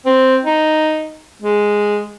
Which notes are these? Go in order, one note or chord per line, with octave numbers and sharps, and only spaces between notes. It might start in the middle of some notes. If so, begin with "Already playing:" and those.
C4
D#4
G#3